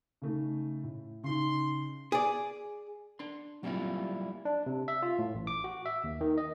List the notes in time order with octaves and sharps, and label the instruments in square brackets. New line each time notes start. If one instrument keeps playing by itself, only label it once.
[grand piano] C#3 A3 D#4
A2
[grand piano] C#3 D#4 [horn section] C6
[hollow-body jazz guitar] G#4 D5
D4 C6
F#3 G3 A#3 C4 E4 F4
[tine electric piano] D4
C3
E5
F4
A2
A1
D6
F#4
E5
D#2
D#3
D#5